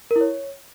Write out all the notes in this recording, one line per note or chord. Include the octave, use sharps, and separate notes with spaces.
A#4
E4
C#5